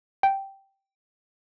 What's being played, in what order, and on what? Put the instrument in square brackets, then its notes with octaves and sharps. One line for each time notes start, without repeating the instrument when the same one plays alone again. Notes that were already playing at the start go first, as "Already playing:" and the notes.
[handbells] G5